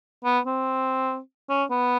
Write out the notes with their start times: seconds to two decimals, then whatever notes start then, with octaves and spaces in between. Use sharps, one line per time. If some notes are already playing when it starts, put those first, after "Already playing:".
0.25 B3
0.46 C4
1.49 C#4
1.70 B3